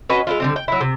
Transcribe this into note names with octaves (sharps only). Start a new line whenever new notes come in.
C#4 F#4 B4 D#5
G#3 E4 F4
D3 G3 C4
G5
F#3 E4
C3